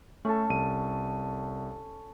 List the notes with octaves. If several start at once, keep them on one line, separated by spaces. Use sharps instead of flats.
A3 C#4 A4
C2 D#7